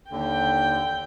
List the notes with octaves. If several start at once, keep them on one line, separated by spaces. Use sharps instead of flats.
D#2 D3 G5